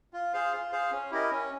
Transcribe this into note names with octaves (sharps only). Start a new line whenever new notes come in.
F4
G#4 C5 F5
F4
G#4 C5 F5
C#4
E4 G4 A#4 D#5
C#4